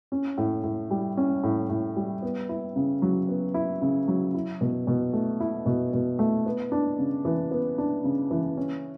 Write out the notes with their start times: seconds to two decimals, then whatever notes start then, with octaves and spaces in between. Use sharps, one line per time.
0.12 C#4
0.38 A2
0.64 A2
0.91 G3
1.17 C#4
1.44 A2
1.69 A2
1.96 G3
2.22 B3
2.49 E4
2.76 C#3
3.02 F#3
3.29 B3
3.54 E4
3.82 C#3
4.08 F#3
4.34 E4
4.61 B2
4.87 B2
5.13 A3
5.40 E4
5.66 B2
5.93 B2
6.19 A3
6.46 B3
6.72 D4
6.98 C#3
7.25 E3
7.51 B3
7.78 D4
8.04 C#3
8.31 E3
8.57 C#4